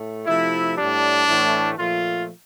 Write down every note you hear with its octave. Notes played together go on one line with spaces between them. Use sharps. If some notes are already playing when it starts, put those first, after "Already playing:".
Already playing: A2 A3
C3 F3 A3 E4
A2 G3 D4
A2 E3 A3
A#2 F3 A3 F4